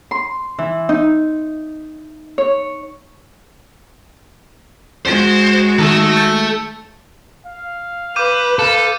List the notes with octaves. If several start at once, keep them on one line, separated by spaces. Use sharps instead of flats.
C6
E3
D#4
C#5
G#3 F#4 C5
D#3 D#4 A4 E5 E7
G6 A6 C#7
F5
B4 D6 G6 D#7
A4 F5